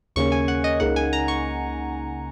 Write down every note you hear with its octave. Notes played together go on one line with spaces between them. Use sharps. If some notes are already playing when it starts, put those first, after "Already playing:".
D#2 C#3 A#3 C#4 C#6
G#5
F#5
D#5
C#2 C#3 A#3 D#4 F#5
G#5
A#5
C#6